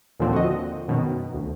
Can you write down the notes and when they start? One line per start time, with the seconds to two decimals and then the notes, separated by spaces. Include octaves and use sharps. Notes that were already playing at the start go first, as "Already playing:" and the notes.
0.19 D#2 A#2 D3 F3 C4
0.33 F#4 D#5
0.88 F#2 B2 D#3
1.34 D2